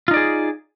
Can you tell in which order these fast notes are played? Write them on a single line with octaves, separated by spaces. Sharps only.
F4 D#4 D5 G#4